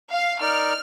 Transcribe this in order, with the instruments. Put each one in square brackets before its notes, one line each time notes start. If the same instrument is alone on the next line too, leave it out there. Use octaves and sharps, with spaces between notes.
[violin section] F5
[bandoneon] D#4 A#4 D5 [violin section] F6